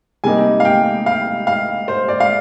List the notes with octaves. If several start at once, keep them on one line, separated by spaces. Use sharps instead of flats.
C3 G3 A#3 D#4 G#5
F5
G5
F5
F5
C5
D5
F5